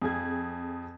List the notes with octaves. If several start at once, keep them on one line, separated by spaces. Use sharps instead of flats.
F2 G#4 G#6